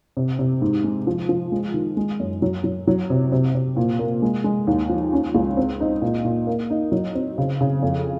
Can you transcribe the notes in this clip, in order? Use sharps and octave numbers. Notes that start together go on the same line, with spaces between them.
C3
C3
G#2
G#3
F3
F3
G#3
D#3
G#3
F#2
F#3
F#3
F#3
C3
C3
C3
A#2
A#3
G#3
G#3
D#2
F3
C#4
C#2
C4
D#4
A#2
A#2
A#3
D#4
F#3
C4
C#3
C#3
F2